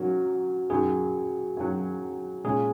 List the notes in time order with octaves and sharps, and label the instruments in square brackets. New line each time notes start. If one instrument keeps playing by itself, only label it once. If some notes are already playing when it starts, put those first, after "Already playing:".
Already playing: [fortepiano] G#2 F#3 C#4 A#4 [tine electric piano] F#4
[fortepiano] F#2 D#3 F#3 [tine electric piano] G#4
[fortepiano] F#2 D#3 F#3
[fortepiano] A#2 G#3 C#4 [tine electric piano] G#4